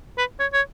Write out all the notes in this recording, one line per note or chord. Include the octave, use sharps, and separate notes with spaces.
B4
C#5
C#5